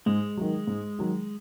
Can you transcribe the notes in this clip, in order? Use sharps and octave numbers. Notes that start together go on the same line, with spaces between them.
G#2 G#3
D#3 F#3
G#2
D#3 F#3